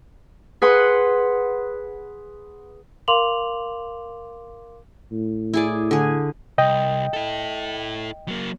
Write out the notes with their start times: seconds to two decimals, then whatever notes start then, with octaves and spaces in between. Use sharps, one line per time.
0.62 G#4 B4 F#5 C6
3.08 A#4 F5 C6 D6 F7 F#7
5.12 A2
5.54 E4 G#4 D5
5.91 D3 G#4
6.58 C2 D#5 G5
7.13 E4 A4
8.28 F#3 A#3